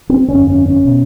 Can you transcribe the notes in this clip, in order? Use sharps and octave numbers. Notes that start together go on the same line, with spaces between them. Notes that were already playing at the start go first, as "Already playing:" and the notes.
C4
G1 F2 D3 C#4
C#4
C#4
B2